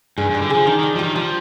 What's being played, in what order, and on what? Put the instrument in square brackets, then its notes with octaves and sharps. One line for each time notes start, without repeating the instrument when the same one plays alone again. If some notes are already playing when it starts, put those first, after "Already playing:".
[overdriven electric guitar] G2 [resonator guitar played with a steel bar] G#4
[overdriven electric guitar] G2
[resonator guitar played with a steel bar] G3
[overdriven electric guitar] D3
[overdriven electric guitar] F3 [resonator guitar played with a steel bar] G#4
[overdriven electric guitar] D#3 [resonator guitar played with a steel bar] D4
[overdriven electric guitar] D#3
[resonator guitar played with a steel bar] G3
[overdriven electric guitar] F3
[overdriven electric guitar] D#3 [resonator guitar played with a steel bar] G3
[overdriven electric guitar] F3 [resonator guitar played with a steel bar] G3